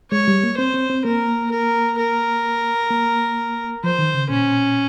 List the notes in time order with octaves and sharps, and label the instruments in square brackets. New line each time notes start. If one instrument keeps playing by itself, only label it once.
[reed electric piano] G#3 [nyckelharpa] C#5
[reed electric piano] G3
A#3
[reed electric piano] C4 [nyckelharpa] C5
[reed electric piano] C4
C4
[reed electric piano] A#3 [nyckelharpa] A#4
[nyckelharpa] A#4
A#4
[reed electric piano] A#3
[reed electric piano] F3 [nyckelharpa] C5
[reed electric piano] D#3
C#3
[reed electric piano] A#2 [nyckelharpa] C#4